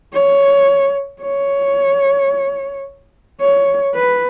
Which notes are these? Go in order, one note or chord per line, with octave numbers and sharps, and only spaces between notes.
C#5
C#5
C#5
B4